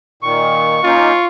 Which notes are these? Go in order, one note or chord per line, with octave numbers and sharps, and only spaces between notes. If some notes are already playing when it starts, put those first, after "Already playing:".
A#2 D#3 C#6
A#3 C#4 D#4 F4